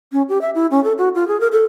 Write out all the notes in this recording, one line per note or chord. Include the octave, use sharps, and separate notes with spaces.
C#4
G4
E5
E4
C#4
A4
F#4
F4
G#4
A#4
A4